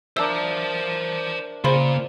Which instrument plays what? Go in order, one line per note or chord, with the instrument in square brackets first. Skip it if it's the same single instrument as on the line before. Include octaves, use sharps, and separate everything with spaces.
[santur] D4 A#4 E5 [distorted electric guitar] C5 A5 [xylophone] E6
[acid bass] C#3 [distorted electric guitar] A#3 F4 [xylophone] C5 B5 C6